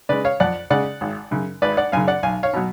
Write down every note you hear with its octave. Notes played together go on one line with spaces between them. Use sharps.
C#3 G#3 B4 D5
C#5 F5
F2 D5 F#5
C#3 G#3 D5 F#5
G#1
F#2 C#3
G#1 B4 D5
D5 F#5
F#2 C#3 F5 G#5
D5 F#5
B1 F5 G#5
C#5 F5
B2 F#3